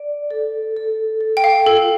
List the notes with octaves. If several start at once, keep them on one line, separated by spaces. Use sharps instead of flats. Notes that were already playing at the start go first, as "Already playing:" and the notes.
Already playing: D5
A4
A4
A4
G5
F5
F4 A4